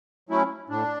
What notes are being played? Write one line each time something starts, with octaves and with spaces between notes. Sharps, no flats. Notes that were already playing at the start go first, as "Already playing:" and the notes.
F#3 A3 C#4 E4
A2 D4